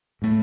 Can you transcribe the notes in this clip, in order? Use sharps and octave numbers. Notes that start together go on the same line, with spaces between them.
A2 A3